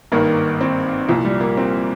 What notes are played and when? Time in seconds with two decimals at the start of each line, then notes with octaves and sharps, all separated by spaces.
0.12 G#1 G2 D#3 A#3
0.61 C4
1.09 C2 A#2 F3
1.25 G3
1.41 A#3
1.57 C4